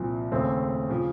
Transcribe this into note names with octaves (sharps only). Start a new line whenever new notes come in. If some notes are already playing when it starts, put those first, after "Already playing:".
Already playing: C2 A#2 F3
D#2 C#3 A3 C4
C#3 F3